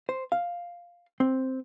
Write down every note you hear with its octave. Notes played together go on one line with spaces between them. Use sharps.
C5
F5
C4